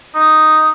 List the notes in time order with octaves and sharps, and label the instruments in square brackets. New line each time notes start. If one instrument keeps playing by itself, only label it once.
[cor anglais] D#4